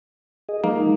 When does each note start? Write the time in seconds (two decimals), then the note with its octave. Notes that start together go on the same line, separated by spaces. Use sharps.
0.49 G#4 D#5
0.64 F3 G#3 A#3 D#4